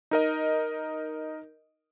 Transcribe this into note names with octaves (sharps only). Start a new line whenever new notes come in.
D#4 A#4 D#5